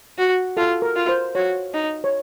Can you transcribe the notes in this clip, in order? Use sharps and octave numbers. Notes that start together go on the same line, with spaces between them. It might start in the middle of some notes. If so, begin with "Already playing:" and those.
F#4
F4 A4
A#4
F4
C5
F#4 C#5
D#4
C#5